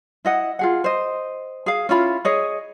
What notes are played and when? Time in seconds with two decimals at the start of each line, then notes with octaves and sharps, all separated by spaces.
0.25 E4 D#5 F#5
0.59 F4 G#4 F#5
0.84 C5 D#5
1.66 G#4 F5
1.89 C#4 E4 F4 B5
2.25 G#4 C#5 D#5